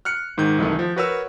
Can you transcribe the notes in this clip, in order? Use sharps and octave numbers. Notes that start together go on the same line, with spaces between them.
F6 F#6 C#7
G#2 D#3 G6
C2 D#3 E3 A3
F3
F#4 A#4 B4 C#5 F#5 E6